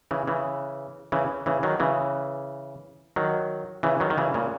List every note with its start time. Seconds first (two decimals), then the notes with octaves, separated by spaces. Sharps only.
0.11 C#3 E3
0.28 C#3 E3
1.12 C#3 E3
1.46 C#3 E3
1.63 D#3 F#3
1.80 C#3 E3
3.16 D#3 F#3
3.83 C#3 E3
4.00 D#3 F#3
4.10 D#3
4.18 C#3 E3
4.34 A#2 C#3